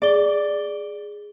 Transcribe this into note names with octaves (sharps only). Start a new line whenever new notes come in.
G#4 D5 G7